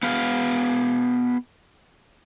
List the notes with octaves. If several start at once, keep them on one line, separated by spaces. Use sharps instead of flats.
B3 F#4 G#4 F5